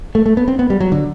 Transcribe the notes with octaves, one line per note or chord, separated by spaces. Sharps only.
A3
A3
B3
C4
B3
G3
F#3
D3